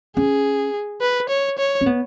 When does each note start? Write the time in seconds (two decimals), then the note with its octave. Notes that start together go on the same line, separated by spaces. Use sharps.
0.17 C#4 G#4
1.01 B4
1.29 C#5
1.58 C#5
1.81 C#4
1.86 B3